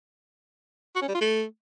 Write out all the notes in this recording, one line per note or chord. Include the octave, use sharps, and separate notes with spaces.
F#4
C#4
G3
F4
A3